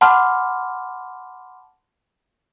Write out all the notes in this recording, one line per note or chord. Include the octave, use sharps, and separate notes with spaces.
F#5 A5 B5 C6 D6 F6